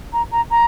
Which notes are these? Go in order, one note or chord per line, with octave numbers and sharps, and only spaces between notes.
A#5
A#5
A#5